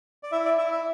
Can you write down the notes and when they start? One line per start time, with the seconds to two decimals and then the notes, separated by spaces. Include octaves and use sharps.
0.23 D5
0.32 E4 E5
0.45 D5
0.58 E4 E5
0.72 E5